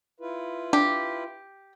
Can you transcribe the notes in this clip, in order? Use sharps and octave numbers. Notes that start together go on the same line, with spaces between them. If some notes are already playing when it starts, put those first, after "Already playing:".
E4 F4 B4
D4 G4